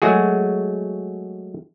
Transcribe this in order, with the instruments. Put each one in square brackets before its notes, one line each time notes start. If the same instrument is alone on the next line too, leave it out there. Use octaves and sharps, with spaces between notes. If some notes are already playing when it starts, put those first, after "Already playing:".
[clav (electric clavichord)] F#3 G#3 A3 F#4 G#4